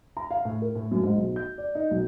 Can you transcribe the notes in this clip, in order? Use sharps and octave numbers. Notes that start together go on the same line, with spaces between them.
A#5
F5
A2
A#4
A2
F#2
G#2
B1
G6
D5
D#4
B1